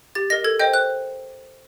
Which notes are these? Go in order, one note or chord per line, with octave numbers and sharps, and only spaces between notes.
G4 A6
A#4 D#5 A#6
A4 G#6
C5 D#5 G5 G6
C5 F#6